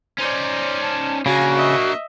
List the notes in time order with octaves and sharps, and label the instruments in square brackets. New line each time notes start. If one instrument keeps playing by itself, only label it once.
[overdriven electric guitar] C#4 D#4 [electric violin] C5 D5
[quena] A5
[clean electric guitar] C#3 [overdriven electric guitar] A#3 D4 [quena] F#4 [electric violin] G#5 A#5
[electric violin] D#5 E5